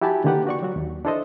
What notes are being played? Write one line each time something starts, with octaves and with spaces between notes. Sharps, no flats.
E4 F#4 G4 G#5 A5 B5
D3 D#3 A#3 G4 B4 F#5
F#4 D5 C#6
F#3 F#4
D#2
D4 E4 A4 C5 D#5